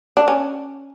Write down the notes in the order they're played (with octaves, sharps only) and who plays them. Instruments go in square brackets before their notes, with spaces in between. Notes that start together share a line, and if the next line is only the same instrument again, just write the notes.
[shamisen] D4
C#4